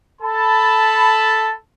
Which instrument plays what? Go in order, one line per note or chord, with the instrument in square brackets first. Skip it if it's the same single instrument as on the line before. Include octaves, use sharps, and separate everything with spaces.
[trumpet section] A4 A5 B5